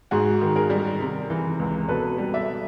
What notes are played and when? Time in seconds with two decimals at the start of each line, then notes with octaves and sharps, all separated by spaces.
0.11 G#2 F#4 G#4
0.41 D#3
0.56 G#4 A#4
0.70 G3
1.00 C3
1.30 E3
1.59 C#2
1.88 B2 A4 B4
2.18 G3
2.34 D5 E5